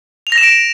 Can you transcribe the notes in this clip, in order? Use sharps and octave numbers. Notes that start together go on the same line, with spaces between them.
F7
A#6
E7
D7